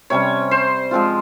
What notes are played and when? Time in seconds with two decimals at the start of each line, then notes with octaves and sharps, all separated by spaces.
0.10 C3 G3 C#4 C#5
0.51 C5
0.91 F3 G#3 C4 F4